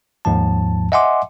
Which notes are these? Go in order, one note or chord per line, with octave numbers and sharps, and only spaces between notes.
D#2 G#2 F3 A5
D#5 E5 F#5 G#5 C6 D6